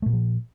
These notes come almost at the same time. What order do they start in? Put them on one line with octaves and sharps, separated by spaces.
A3 A#2 A#3 F3